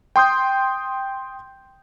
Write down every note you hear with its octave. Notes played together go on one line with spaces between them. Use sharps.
G5 C6 D#6 G6